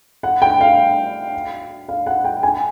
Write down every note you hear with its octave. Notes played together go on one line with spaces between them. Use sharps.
F#5
G5
F5
F5
F#5
G5
G#5